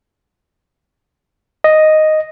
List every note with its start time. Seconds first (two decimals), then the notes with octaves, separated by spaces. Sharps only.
1.64 D#5